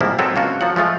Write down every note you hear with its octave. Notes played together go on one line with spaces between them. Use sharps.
G#2 C3 F3 G3 A#3 E4
F#3 G#3 C4 A4 B4 C#5
C#2 A#3 D4 F4 F#4
F3 F#3 F#5
F3 G#3 A3 F4